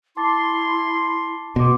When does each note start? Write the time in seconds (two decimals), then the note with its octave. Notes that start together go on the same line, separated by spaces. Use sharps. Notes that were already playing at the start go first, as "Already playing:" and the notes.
0.17 E4 A5 C6 D6 A6
1.56 B2 B3 C6 D6